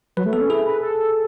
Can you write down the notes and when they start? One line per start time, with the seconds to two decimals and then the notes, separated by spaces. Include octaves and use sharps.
0.17 F#3 B4
0.26 A3
0.33 B3 A4
0.41 C#4
0.49 E4 G#4
0.66 B4
0.81 A4